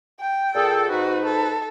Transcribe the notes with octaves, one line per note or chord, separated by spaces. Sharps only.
G5
A#2 G#4 A4
G#2 D#4 F#4 B4
A4